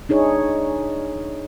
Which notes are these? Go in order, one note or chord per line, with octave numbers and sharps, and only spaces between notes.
D4 D#4 G#4 C#5